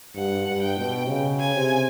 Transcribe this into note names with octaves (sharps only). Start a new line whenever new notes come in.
G2 F#5
G2
G5
B2
C#3
G#5
C3